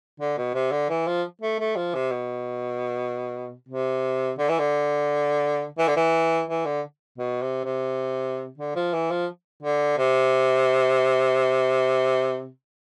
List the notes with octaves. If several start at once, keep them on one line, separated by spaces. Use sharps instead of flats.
D3
B2
C3
D3
E3
F3
A3
A3
F3
C3
B2
C3
D3
E3
D3
E3
D3
E3
E3
D3
B2
C3
C3
D3
F3
E3
F3
D3
C3